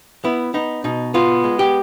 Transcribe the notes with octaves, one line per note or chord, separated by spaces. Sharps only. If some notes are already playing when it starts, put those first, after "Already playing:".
B3 E4
B3 D#4
B2 D#4
B3 F4
G#3
G4